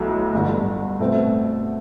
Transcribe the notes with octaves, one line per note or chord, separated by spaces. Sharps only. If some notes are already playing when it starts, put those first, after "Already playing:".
Already playing: B1 A2 F#3 A3
G1 G2 D3
B2 A3 C4